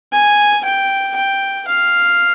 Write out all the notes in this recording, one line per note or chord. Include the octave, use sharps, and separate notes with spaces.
G#5
G5
G5
F5